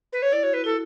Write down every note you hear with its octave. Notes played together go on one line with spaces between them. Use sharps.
B4
C#5
E4 D5
F#4 C#5
E4 B4
E4 A4